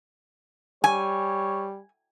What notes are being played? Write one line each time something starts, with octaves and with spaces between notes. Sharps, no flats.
G3 C#5 G#5